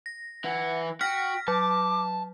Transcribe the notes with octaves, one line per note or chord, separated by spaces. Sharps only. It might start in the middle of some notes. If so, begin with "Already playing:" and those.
A#6
E3 E4 F#5
F#4 G5 F6 A#6 B6
F#3 A5 D6